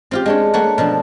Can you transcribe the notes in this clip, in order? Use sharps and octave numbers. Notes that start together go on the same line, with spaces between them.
C4 F4 G4
G#3 D4 C#5
A3 A#3 C#5 F#5
B2 F3 D4